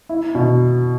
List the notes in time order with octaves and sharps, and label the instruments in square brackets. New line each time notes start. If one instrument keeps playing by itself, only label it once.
[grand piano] E4
B2